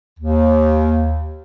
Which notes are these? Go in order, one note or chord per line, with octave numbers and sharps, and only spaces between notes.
D#2